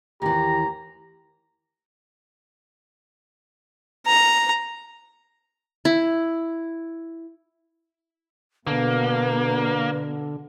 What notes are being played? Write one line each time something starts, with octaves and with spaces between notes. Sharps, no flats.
D#2 E3 G4 A#5
A#5
E4
B2 D3 A#3 B4